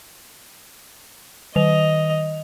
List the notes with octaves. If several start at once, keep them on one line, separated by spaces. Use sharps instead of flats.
D#3 D#5 F7